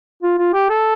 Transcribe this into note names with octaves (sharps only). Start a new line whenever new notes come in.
F4
F4
G4
A4